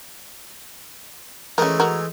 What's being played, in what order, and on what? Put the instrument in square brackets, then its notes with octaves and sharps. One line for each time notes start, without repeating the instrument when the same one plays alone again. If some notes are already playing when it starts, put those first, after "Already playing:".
[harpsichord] E3 G#3 A3 [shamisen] C#4 A#4
[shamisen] F#4 A#4